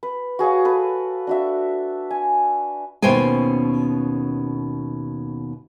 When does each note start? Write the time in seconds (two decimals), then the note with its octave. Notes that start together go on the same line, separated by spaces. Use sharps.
0.03 B4
0.39 F#4 G#4 C#5 F5
0.65 A4 B4
1.27 D4 F#4 E5
2.10 G#5
3.02 D#2 B2 C#4 C5 G5 G#5